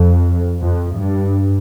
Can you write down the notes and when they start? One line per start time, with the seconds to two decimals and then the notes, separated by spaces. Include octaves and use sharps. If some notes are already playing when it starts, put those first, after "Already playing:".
Already playing: F2
0.60 F2
0.98 G2